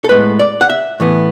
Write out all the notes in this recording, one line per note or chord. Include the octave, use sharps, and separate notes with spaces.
A4
A2 G#3 B3 B4
D5
F#5
E5
A2 E3 B3